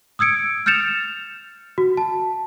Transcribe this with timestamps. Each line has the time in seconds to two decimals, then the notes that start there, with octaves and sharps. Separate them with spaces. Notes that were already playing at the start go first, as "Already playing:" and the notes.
0.19 D#6 E6 G#6 C#7 D7
0.66 F6 G6 A6 C#7 E7 F7
1.78 F#4
1.97 A5